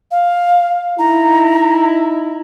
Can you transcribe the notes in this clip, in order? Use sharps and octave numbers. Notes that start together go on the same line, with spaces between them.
F5
D#4 E4 A#5